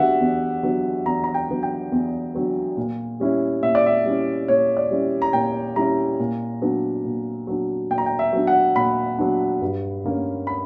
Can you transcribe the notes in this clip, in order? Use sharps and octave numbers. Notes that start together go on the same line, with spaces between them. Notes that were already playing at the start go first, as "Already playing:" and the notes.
Already playing: D3 F#3 B3 F#4 G4 E5 F#5
E2
D3 F#3 B3
E2 A#5
A#5
G5
D3 F#3 B3
G5
E2
D3 F#3 B3
A#2
G3 C#4 E4
A#2 E5
D5
E5
G3 C#4 E4
A#2 C#5
D5
G3 C#4 E4
A#5
A#2 G5
G3 C#4 E4 A#5
A#2
F#3 B3 D4
A#2
F#3 B3 D4
A#2 G5
A#5
G5
E5
F#3 B3 D4
F#5
A#2 B5
F#3 B3 D4
G2
D3 A#3 C#4
B5